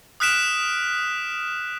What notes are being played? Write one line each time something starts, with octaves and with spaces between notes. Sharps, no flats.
D#6 F6 F#6 B6 D7 E7